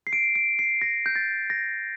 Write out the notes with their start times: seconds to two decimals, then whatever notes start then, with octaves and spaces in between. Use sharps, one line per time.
0.07 C7
0.13 D7
0.35 D7
0.59 C7
0.82 A#6
1.06 G6
1.16 A6
1.50 A#6